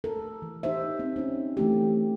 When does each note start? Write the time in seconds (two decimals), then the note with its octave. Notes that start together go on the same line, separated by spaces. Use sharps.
0.04 A4 A#4
0.42 E3
0.63 D#4 G4 C5 E5
0.99 C4
1.16 C#4 D#4
1.57 E3 A3 G4